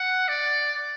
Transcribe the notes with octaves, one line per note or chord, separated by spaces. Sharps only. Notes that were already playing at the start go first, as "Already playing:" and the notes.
Already playing: F#5
D5